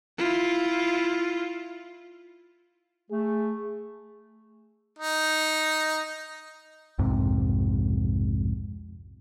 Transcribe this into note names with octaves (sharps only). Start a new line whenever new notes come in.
E4 F4
A3 G#4
D#4
B1 F2 G#2 C3